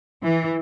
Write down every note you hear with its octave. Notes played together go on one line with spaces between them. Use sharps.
E3